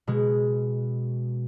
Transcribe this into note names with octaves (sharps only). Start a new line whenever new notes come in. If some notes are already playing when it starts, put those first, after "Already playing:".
B2 G#3